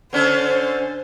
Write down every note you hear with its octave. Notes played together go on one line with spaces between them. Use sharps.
D3 C#4 A4 C5